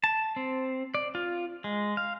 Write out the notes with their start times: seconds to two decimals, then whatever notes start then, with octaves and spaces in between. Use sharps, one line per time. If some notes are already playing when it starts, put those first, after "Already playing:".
0.04 A5
0.36 C4
0.95 D5
1.15 F4
1.64 G#3
1.97 F5